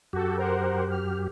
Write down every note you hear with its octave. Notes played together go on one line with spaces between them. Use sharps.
F#2 F#4 G4 A4
A#4 C5 F#5
F6